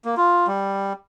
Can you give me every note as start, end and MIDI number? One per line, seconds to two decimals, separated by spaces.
0.05 0.15 58
0.17 0.47 65
0.47 0.93 55